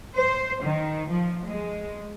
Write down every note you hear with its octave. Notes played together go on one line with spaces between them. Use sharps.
C5
D#3
F3
G#3